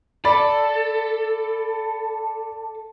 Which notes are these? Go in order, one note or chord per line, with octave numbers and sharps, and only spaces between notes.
A4 D5 B5